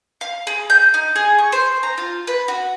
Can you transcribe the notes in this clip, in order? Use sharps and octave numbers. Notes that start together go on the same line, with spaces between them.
F5
G#4
G6
D#4
G#4
C#6
C5
A#5
F4
B4
F#4